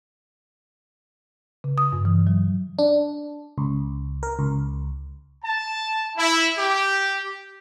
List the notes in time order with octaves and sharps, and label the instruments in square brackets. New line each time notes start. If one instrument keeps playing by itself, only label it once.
[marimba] C#3
D#6
G2
E3
F#3
[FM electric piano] D4
C#2
A#4
C#2
[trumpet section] A5
E4
G4